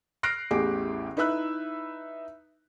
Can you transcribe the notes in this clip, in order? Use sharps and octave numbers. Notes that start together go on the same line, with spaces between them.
F6 F#6 A#6 C7 D7
A1 E2 A2 G4 G#4 D6
D#4 E4 B4 E5 E6 F#6